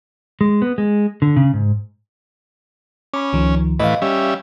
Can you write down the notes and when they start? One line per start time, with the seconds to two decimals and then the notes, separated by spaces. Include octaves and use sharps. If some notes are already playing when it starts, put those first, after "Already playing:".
0.41 G#3
0.62 B3
0.78 G#3
1.22 D3
1.36 C#3
1.54 G#2
3.14 C#4 B5 D6
3.33 C#2 D#3 F3
3.80 A2 E3 B4 D#5 F5
4.02 G3 C#4 E5